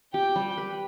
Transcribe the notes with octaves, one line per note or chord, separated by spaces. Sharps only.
G4 G5
G3
B4